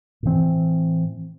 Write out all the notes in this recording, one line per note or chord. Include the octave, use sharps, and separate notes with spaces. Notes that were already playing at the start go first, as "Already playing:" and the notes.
A2 E3 C4